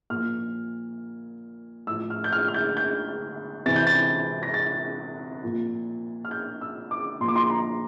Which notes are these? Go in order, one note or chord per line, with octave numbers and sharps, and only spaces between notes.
A#2 F3 F6
A2 F3 E6
F6
G6
F6
F6
G6
G6
C3 E3 A6
G6
A6
A#6
A6
A#2 F3
F6
G6
E6
D6
A#2 F3 C6 D6
C6
A#5